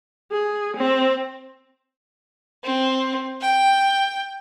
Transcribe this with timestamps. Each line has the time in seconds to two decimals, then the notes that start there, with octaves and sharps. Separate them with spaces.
0.32 G#4
0.77 C4
2.64 C4
3.41 G5